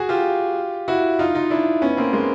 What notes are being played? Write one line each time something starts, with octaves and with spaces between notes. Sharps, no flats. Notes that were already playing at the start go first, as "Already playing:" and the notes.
Already playing: F#4 G#4
F4 G4
E4 F#4
D#4 F4
D#4 F4
D4 E4
B3 C#4
A#3 C4
G#3 A#3